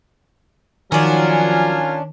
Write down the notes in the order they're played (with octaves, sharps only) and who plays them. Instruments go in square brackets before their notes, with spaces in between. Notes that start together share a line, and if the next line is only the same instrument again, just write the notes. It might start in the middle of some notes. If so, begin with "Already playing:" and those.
[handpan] D#3 [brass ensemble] F3 F#3 [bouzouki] C#4 D4 [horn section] F4 A#4 G#5